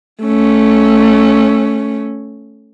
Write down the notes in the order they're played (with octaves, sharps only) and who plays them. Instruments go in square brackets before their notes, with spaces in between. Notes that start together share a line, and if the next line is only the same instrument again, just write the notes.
[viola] A3 C#4